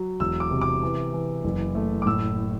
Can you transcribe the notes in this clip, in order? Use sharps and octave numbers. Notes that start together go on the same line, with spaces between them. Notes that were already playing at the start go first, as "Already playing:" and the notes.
Already playing: F#3
E1 E6
D6
C3
D6
E3
E3
F#1
A3
D6
A2 E6